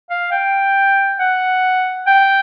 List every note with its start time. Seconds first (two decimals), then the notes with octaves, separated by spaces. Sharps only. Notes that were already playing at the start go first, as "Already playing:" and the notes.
0.10 F5
0.32 G5
1.19 F#5
2.07 G5